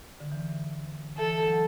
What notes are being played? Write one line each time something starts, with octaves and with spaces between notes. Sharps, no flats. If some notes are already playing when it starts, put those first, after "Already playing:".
D3
E3
E3 A4
E3
F#3